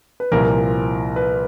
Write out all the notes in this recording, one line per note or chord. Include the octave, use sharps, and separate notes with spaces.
B4
C2 A#2 F3 A#4
B4